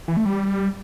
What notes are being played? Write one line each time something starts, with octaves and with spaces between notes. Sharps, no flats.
E3
A3
G3